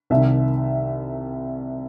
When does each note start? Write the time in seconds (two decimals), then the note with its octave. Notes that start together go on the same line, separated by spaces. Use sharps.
0.10 C2 C3 D#3 E5